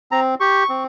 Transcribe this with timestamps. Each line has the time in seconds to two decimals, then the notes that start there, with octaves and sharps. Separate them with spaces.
0.12 C4 A#5
0.40 G4 C#6
0.69 C4